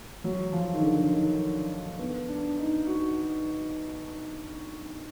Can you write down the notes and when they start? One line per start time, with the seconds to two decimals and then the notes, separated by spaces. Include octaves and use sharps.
0.24 F#3
0.53 F3
0.73 D#3
0.81 D3
1.11 D#3
1.99 B3
2.28 D4
2.58 D#4
2.86 F#4